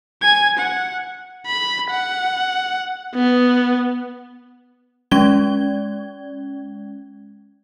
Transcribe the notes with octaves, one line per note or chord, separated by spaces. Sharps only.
G#5 G#6
F#5
B5
F#5
B3
G#3 C#4 G#6 G7